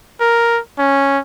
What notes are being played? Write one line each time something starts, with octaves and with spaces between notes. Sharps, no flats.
A#4
C#4